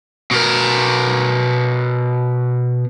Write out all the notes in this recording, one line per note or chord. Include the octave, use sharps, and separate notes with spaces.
B2 A#4